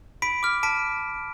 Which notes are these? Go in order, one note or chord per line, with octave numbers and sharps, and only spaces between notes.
B5 B6 D7
D6 F6
A5 B6 D7